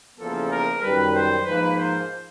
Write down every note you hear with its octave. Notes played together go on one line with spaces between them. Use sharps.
E2 C#3 F3 A#3 A4
A#4
F#2 D#3 G3 B4
C5
G#2 F3 A#3 D#4 B4
C5